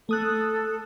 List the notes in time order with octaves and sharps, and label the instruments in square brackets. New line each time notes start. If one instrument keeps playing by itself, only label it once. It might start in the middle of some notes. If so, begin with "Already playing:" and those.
[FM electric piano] A3 D#6 F#6 [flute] A4